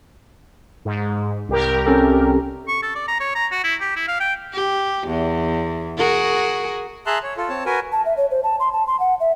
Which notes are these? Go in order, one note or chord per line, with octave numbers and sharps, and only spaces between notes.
G#2
C2 G4 A#4
C4 C#4 A4
C#6
A4
D5
A#5
C#5
A#5
F#4
E4
G4
E4
F5
G5
G4
E2
F#4 G#4 A#4
G#4 E5 A5 A#5 C6 F#6
C#5
F4 A4
C4 C#5 A5
F#4 A#4 B4 G#5
A5
E5
C#5
C5
A5
C6
A5
C6
F#5
E5